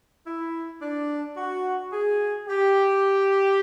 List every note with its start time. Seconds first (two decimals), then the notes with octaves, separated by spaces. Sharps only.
0.27 E4
0.82 D4
1.37 F#4
1.93 G#4
2.48 G4